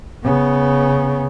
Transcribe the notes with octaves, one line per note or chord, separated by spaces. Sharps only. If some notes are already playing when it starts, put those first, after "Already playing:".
C#3 B3